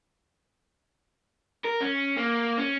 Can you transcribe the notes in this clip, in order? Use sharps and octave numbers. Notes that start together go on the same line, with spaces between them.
A#4
C#4
A#3
C#4